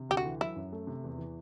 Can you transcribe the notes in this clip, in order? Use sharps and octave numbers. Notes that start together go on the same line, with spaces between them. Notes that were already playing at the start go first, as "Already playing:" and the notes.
Already playing: C3
D2 G4
F#4
E3
F#3 E4
F#2
A3
C3
E2
E3